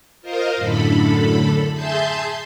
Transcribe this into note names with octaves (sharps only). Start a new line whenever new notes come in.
F4 A#4 C5 D#5 F5
F#2 A2 D3 A4 B5
G#4 E5 A5 C6 G6